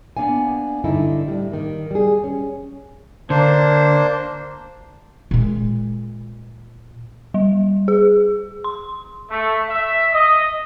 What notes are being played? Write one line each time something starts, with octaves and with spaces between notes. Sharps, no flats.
A#3 B3 C#4 D4 F5 G#5
G2 D3 D#4 E4
A2 G3
D#3 A#3
G3 G#4
C#4
D3 A#3 D4 C5
A#2 G#3
G3
G#4
C6
A3
E5
D#5